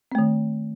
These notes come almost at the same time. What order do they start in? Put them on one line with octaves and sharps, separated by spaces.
C4 A3 D#3